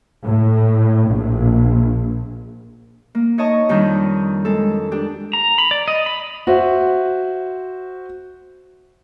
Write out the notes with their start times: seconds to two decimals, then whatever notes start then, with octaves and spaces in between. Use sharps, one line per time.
0.25 A2
1.10 A#1
3.15 A#3
3.38 D#4 C#5 D#5 A5 C#6
3.69 F2 D#3 G3 D4 D#4 G6
4.45 G#3 A4
4.92 D4 G4
5.33 A#5
5.58 B5
5.71 D5
5.88 D#5
6.06 B5
6.47 F#4 C5 E5